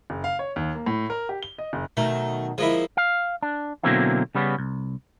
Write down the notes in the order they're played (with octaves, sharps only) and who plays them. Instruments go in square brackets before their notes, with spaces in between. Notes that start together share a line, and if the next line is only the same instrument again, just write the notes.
[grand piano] F#1
F5
C#5
D#2
A#3
A2
A#4
G4
G7
D#5
F#1
[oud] B2 D#3 F#3 [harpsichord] A3
[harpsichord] F3 A#3 E4 [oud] G#3
[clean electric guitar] F5
D4
B2 D3 F#3 A#3 C4 E4
C#3 G3 B3 C#4
C2